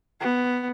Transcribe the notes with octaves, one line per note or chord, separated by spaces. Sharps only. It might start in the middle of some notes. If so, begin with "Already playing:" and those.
B3